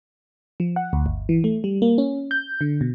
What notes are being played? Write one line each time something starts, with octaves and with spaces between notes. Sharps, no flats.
F3
F#5
D2
G1
E3
A3
G3
A#3
C#4
G6
D3
B2